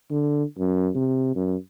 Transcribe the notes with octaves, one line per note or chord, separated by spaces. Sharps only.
D3
F#2
C3
F#2